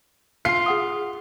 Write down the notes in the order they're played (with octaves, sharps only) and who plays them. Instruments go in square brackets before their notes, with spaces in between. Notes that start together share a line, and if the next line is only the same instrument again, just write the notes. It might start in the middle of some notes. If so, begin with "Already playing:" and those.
[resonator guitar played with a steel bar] F4 [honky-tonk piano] C7
[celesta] G#4 F#5 D#6